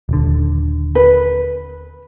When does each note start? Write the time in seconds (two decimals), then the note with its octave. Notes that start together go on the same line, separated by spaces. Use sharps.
0.09 D#1 D3
0.95 B4